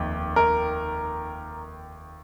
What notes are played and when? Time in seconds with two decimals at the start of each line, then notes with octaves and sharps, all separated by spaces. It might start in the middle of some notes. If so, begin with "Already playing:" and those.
Already playing: F1 D#2 D#3
0.36 A#4